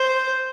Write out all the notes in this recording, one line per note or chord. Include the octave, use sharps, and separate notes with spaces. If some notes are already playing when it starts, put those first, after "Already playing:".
Already playing: C5